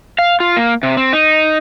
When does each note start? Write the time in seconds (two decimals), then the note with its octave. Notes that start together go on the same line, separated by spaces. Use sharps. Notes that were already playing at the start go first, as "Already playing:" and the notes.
0.19 F5
0.40 F4
0.57 A#3
0.83 C3
0.97 C4
1.13 D#4